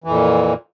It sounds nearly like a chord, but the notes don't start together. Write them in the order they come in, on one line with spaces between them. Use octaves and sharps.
E3 F2 A#2